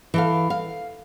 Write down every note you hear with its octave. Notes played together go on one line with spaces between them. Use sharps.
E3 A4 F5
F5